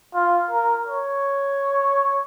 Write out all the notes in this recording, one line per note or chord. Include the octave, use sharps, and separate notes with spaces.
F4
A#4
C#5